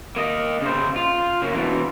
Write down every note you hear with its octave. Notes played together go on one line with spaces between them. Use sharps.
A#3 D#5
C#3 C5
F4
C#3 A#3
B2 E3